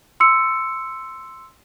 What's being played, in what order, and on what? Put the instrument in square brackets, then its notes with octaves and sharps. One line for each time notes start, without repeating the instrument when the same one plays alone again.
[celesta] C6 E6 C#7